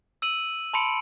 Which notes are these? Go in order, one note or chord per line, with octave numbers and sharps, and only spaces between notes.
E6 D#7 F#7
A5 B5 C6 C#7 D7